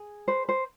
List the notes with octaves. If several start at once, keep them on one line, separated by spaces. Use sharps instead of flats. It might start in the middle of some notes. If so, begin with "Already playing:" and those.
Already playing: G#4
B4 C5
C5